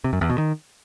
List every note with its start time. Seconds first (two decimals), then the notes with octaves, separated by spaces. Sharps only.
0.04 C3
0.13 F#2
0.21 E2
0.30 B2
0.38 D#3